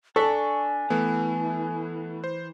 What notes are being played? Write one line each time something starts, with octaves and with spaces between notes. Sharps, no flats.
D4 A4 G#5 C#6 B6
E3 A3 B3
C5